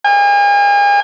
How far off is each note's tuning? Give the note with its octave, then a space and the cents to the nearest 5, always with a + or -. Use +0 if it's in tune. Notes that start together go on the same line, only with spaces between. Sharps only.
G#5 -40